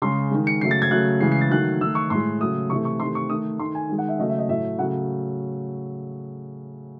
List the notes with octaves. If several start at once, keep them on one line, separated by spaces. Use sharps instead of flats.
C#3 G#3 C6
D#3 G#3
C#7
C#3 F#3 A3 C7
A6
G#6
C#3 F#3 A3 F#6
C#3 E3 G#3 C7
C7
A6
D#3 F#3 A3 F#6
D#3 A3 E6
C#6
A2 G#3 C6
C#3 F#3 A3 D#6
C3 E3 A3 C#6
C#6
C3 D#3 A3 C6
C#6
D#3 A3 D#6
D#3 A3 C6
G#5
D#3 G#3
F#5
E5
C#3 F#3 A3 D#5
E5
D#5
A2 F#3 A3 E5
C#3 F#3 A3 F#5